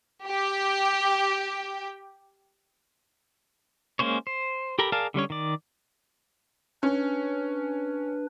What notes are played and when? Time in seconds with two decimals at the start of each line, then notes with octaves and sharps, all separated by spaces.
0.24 G4 G5
3.99 G#3 A#3 C#4 C5 C#5
4.27 C5
4.79 G4 A4 A#4 A#5 B5
4.92 G#4 A#4 D5 F5 A5
5.14 D3 G3 C#4 C#5
5.30 D#3 D5
6.83 C#4 D4 B4